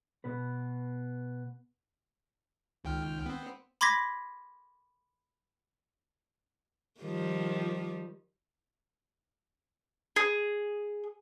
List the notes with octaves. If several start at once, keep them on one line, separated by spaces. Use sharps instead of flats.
B2 B3 B4
C#2 D#3 G5 F6
B3 C4
B5 C6 D6 G#6 A#6 B6
D#3 F3 G3
G#4